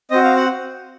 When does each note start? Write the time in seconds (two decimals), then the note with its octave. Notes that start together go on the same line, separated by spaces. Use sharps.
0.11 C4 F#4 D#5
0.24 F5
0.36 F#5